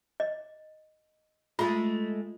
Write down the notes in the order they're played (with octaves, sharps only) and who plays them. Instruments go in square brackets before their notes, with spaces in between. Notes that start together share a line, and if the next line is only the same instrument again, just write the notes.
[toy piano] D#5
[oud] G#3 A3 [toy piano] F4